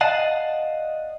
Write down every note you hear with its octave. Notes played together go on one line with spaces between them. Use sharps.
D5 D#5 F5 F#5 A5